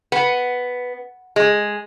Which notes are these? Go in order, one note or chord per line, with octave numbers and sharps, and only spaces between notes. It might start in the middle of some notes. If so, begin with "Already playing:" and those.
B3
G#3